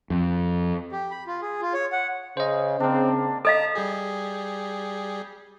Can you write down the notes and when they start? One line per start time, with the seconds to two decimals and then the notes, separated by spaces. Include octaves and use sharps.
0.10 F2
0.92 G4
1.11 B5
1.27 F4
1.42 G#4
1.61 F4
1.74 C#5
1.92 F#5
2.37 C#3 C5 D#5
2.80 C#3 A#3 C4 D4
3.45 A4 D#5 F5 A5 A#5
3.75 G3 G4 G#4